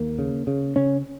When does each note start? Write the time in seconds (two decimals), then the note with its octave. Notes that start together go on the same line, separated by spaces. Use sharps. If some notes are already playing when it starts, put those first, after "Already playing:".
Already playing: D#2 A#3
0.19 C#3
0.47 C#3
0.76 C#3 C#4